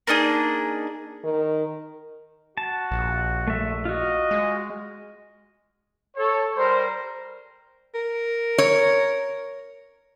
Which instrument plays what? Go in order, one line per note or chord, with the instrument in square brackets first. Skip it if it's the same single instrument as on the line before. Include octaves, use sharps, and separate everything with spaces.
[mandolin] A#3 D4 D#4 G#4
[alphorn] D#3
[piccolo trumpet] F#4 [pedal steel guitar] A5
[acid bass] A#1
[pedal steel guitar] A3 E5
[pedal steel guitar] F4 F#4 [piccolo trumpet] D#5
[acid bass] G#3
[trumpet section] A4 C#5
G3 A#4 C5
[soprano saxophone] A#4
[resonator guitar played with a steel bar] C#5